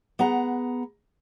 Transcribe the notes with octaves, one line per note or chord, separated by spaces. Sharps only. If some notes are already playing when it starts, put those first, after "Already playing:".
B3 G#4 F#5 A#5